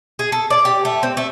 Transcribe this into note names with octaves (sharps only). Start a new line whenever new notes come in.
G#4
A4
D5
G4
A3
C4
A3